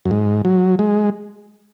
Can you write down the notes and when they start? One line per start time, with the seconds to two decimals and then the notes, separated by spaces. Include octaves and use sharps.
0.05 F#2
0.11 G#2
0.45 F#3
0.79 G#3